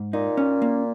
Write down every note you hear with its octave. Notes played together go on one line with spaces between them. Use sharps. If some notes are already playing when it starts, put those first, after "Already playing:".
Already playing: G#2
A#2 D#4
C#4
A#3